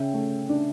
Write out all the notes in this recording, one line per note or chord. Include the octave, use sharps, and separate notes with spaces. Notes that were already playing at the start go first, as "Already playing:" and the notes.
Already playing: C#3 E5 G5
A3
D4